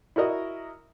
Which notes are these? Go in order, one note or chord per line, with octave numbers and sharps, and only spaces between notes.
E4 F#4 A#4 D#5